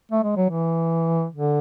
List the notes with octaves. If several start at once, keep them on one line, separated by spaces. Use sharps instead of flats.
A3
G#3
F#3
E3
D3